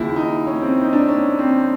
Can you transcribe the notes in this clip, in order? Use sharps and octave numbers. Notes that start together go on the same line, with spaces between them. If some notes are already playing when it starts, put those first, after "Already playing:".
Already playing: D#2 C#3 F3 E4
D#4
C#4
C4
D#4
D4
C#4
C4